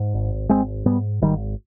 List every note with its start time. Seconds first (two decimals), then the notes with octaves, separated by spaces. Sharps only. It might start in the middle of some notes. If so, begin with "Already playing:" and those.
Already playing: G#2
0.14 G#1
0.49 G#1 G#3 C4
0.86 G#2 G3 B3
1.22 G#1 D#3 G3